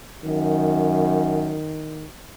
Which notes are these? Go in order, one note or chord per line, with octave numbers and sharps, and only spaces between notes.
F#2 D#3